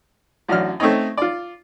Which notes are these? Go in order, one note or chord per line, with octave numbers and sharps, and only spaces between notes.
A1 F#2 D4 F6
A3 C4 C#4 D#4
F4 D5